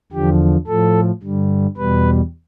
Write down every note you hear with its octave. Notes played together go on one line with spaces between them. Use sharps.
E2 D3 F3 G4
A2 F3 A4
G2 D3 G3
E2 B2 G3 B4